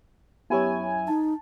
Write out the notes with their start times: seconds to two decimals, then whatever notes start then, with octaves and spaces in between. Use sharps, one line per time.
0.50 F#2 B3 E4 G4 C#5 G#5
1.08 D#4 A5